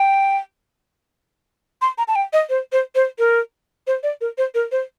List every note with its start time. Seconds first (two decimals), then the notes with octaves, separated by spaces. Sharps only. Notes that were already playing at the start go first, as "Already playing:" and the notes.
Already playing: G5
1.82 C6
1.98 A#5
2.08 A5
2.16 G5
2.33 D#5
2.50 C5
2.72 C5
2.95 C5
3.19 A#4
3.87 C5
4.03 D5
4.21 A#4
4.38 C5
4.55 A#4
4.72 C5